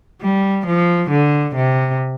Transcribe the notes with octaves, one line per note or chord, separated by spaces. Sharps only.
G3
F3
D3
C3